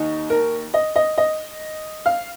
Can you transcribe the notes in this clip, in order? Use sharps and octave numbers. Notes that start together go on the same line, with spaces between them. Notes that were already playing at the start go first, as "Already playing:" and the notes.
Already playing: D#2 D#4
A#4
D#5
D#5
D#5
F5